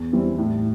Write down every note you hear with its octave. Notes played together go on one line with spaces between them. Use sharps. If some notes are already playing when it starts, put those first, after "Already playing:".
Already playing: E2
E3 G3 C4 E4
A2